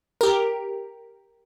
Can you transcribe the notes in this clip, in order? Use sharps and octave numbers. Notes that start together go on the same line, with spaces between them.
G4 A#4